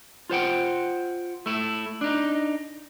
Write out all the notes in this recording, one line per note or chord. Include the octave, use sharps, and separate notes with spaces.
F4 C5 F#5 G5
A3 E4
D4 D#4